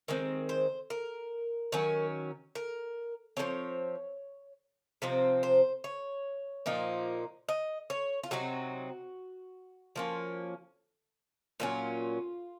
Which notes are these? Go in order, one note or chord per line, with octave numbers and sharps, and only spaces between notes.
D#3 G#3 C4
C5
A#4
D#3 F#3 C#4
A#4
F3 G#3 C4 C#5
C3 F3 C4 D#4
C5
C#5
A#2 F3 A#3 D#4
D#5
C#5
F4
C3 F#3 C4 D#4 F#4
F3 A#3 C#4
A#2 F#3 C#4 F4